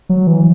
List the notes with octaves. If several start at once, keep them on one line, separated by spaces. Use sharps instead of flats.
F#3
E3